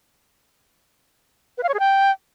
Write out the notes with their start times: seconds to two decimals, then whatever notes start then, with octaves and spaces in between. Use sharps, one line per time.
1.58 B4
1.63 F5
1.69 C#5
1.74 G#4
1.79 G5